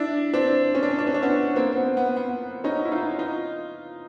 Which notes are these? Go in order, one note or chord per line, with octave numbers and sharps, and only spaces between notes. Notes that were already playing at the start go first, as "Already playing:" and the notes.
Already playing: D4 E4
C4 D4
C#4
D4
C#4
D4
C#4
D4
B3 C#4
A#3 C4
C4
B3
B3
B3
C#4 D#4
E4
D#4 F4
D#4 F4